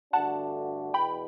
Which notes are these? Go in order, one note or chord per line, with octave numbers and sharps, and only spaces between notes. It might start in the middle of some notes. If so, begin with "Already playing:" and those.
G2 D3 A3 D4 F#4 F#5 A5
E2 B2 G5 B5